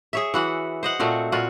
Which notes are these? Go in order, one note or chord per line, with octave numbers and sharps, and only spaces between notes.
G#4 C#5 E5
E3 F#4 F#5
C5 D#5 F#5
A#2 A3 C4 F#4
A#2 F4 F#4